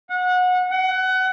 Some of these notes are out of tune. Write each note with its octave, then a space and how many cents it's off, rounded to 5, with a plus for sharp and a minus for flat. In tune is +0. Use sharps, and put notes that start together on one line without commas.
F#5 -25
F#5 +25